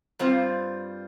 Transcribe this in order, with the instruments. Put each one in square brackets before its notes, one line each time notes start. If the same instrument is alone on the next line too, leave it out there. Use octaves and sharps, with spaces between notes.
[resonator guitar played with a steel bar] G2 G3 C4 F4 [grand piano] C5